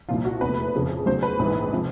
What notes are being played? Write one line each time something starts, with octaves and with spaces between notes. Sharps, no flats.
C2 A#2 F3 F4
F#4
F1 E2 C3 B4
F2 C#3 F3
F1 E2 C#3 F#3 C5
B4
A#1 G#2 E3
C3 F3